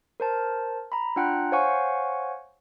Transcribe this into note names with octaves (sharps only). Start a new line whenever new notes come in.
A#4 C5 A5
A#5 B5
D4 F4 F#5 G5 A#5 F#6
C5 C#5 F5 F#5 G#5 C#6